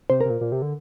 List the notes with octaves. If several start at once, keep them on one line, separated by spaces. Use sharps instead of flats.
C3 C5
C3 A#4
A#2
A#2
C3
D3